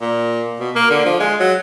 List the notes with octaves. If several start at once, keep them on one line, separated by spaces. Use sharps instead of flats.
A#2
B2
A#3
D3
F3
G#3
F#3